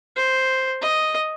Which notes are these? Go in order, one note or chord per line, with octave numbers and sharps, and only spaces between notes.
C5
D#5